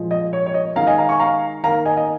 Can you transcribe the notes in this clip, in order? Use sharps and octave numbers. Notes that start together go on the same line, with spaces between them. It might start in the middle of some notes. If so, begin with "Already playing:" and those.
Already playing: A#2 F3 G#3
D#5
C#5
C#5
D#5
D#3 G#3 F5 A#5
D#5 G#5
F5 A#5
G#5 C#6
F5 A#5
D#3 A#3 F5 A#5
D#5 G#5
D#5